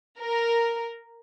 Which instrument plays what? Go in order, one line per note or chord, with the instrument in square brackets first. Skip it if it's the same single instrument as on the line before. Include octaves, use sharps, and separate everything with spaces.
[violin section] A#4